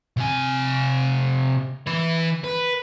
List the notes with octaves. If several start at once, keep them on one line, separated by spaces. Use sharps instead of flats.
C3 G#5
E3 B4
B4